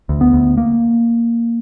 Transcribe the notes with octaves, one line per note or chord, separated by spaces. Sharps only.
D2
B3
D2
A#3